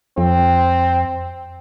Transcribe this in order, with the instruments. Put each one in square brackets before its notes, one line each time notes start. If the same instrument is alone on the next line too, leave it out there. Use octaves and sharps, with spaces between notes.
[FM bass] F2 [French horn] C4